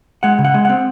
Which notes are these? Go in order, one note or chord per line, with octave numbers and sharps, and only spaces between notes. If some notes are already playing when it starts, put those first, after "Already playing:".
G#3 F#5
C#3
F#5
G#3
C4 F#5